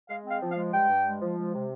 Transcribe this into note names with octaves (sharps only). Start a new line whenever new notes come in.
G#3 F5
C4
F5
F3
F5
G#3
G2 G5
G2
G#3
F3
G#3
C3